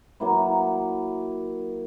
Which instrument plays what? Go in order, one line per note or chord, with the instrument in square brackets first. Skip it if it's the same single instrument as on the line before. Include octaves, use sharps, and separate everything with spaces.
[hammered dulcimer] F#3 A#3 E4